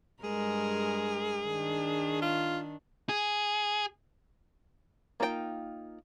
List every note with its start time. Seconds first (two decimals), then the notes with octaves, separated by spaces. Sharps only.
0.23 G2 G#3 G#4 A#4
1.46 D#3 D4
2.22 F4
3.09 G#4
5.20 A#3 D#4 F4 A4 G5